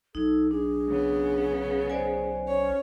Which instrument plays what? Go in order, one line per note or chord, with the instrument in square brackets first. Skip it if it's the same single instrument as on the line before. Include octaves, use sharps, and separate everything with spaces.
[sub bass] B1 [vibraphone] D#4 [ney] A4
[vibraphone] D4 [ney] G#4
[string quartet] C#3 B3
[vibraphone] C5 D5 G#5
[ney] C#4 [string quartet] C#5